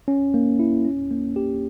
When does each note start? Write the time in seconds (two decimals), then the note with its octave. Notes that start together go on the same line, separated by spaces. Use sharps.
0.08 C#4
0.34 A#3
0.59 E4
0.85 C#4
1.11 A#3
1.36 G4